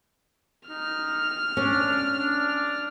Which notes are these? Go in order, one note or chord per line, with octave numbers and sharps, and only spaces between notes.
D#4 F6
C#4 D4
D4